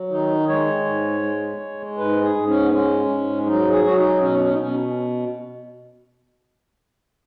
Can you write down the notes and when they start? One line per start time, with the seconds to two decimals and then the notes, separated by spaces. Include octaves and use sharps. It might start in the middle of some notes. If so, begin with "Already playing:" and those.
Already playing: F#3
0.11 D#3 D#4
0.48 G#3 C#5
0.85 G#2
1.23 G#3
1.60 G#3
1.97 G#2 B4
2.22 G#4
2.35 G#2
2.47 C#4
2.64 B3
2.72 G#3 C#4
3.09 G#2
3.46 F#3 D#4
3.71 G#4
3.84 F#3 F#4
3.96 D#4
4.21 B2 C#4
4.34 D#4
4.39 C#4
4.51 D#4
4.58 B2 C#4